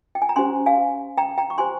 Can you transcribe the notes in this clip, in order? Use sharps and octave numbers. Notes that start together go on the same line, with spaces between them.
G5
G#5
A#5
C#4 G4 C5 G#5 C6
F5 G#5
G5 A#5
G5 A#5
C#6
G4 C5 G#5 C6